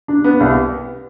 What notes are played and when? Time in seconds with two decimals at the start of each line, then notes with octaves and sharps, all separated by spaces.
0.08 D4
0.24 B3
0.40 C2